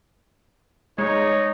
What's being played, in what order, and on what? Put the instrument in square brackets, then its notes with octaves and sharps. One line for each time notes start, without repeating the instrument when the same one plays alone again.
[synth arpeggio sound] G#3 [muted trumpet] D#4 [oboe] C#5